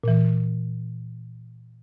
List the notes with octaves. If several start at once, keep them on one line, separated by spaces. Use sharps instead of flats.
A#2 E3